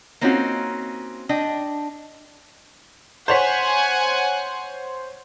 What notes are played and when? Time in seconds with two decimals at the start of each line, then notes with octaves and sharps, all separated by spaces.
0.21 A#3 C4 C#4 D#4 F4 F#4
1.29 D4 D#5 G5
3.28 C5 C#5 F#5 G#5 B6